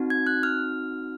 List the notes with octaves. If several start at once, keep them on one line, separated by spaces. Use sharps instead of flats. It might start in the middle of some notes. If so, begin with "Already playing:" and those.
Already playing: C4 D#4 F#4
G#6
F#6
F6